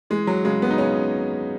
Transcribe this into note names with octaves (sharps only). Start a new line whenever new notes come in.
E3 G#3
F#3
C#3 G#3
B3
D#4
C#3 C#4